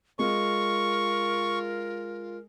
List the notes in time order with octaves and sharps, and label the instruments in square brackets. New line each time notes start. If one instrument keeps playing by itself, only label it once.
[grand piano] G#3 [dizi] F4 [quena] A#4 [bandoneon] C#6